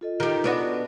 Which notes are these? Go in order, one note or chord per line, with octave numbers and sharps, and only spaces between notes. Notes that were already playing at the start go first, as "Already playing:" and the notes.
F4 A4 D#5
D#3 G4
B3 D4 F#4